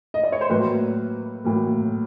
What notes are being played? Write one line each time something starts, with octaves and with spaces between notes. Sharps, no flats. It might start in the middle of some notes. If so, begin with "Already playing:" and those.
D#5
D5
C#5
C5
A2 F#3 A#3 B4
A2 F#3 A#3